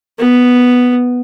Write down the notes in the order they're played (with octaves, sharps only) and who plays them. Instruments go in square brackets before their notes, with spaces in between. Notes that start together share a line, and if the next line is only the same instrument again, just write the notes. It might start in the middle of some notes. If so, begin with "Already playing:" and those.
[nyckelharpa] B3